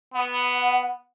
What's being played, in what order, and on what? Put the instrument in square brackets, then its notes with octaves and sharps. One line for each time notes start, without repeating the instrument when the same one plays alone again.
[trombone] B3 [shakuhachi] F#5